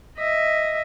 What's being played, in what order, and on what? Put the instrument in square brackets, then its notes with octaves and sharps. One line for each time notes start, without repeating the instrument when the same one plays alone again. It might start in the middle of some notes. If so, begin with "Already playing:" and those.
[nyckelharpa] D#5 E5